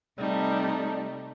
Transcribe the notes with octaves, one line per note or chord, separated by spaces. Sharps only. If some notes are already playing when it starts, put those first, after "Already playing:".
C3 G3 A3 D#4